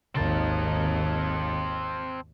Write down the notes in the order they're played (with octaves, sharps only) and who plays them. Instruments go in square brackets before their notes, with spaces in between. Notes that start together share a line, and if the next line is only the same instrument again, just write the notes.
[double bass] G#1 D#2 [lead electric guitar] C4 A5